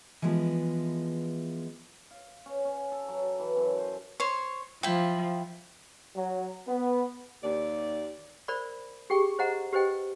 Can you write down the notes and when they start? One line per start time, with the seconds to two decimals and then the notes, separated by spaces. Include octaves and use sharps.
0.22 E3 F3 G#3 B3
2.11 F5
2.46 C#4
2.65 C#4
2.92 A4
3.08 F#3
3.39 E3
3.57 F#2
3.78 C5
4.20 C5 C#5
4.83 F3 E4 G5
6.16 F#3
6.68 B3
7.42 D#2 D5
8.48 A#4 C5 D5 B5
9.10 G4 G#4 G5 C#6
9.39 C5 D#5 F#5 A#5
9.73 G4 B4 C5 D#5 G5